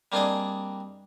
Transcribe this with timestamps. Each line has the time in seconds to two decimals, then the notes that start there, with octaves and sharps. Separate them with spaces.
0.12 G3 A#3 C4 D4 G#4 D#5